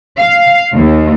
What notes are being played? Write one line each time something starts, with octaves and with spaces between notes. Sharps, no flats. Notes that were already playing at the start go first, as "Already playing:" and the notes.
F5
D#2